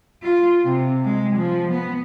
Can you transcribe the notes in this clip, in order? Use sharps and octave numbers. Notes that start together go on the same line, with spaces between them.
F4
C3
G#3
F3
B3